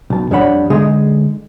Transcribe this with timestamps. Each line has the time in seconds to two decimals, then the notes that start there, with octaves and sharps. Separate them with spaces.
0.10 B1 A5
0.31 F2 G3 D4 C#5 F#5 B5
0.70 D3 G#3 D#4 G#4 D#5